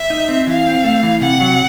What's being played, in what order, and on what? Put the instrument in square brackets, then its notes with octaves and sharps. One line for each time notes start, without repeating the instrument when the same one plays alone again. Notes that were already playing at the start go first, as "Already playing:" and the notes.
Already playing: [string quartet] E5
[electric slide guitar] D#4
C4
[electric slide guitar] E3 [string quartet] F5
[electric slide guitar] C4
A3
E3
[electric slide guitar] C3 [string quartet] F#5
[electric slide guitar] F#3